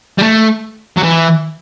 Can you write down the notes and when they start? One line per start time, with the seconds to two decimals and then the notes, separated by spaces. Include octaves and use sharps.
0.18 G3
0.22 A3
0.97 F#3
1.03 E3